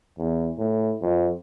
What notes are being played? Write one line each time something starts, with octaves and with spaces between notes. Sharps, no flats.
E2
A2
F2